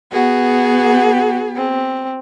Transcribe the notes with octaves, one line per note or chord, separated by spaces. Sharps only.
B3 F#4 G#4
C4